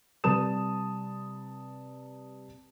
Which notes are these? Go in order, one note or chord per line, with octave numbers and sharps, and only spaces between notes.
C3 G3 B4 A5 D#6 E7